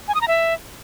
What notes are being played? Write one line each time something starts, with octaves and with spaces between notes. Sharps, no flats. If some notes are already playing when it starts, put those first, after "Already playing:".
G#5
D#6
A#5
E5